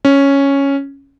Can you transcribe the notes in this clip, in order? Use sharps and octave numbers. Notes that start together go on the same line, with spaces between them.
C#4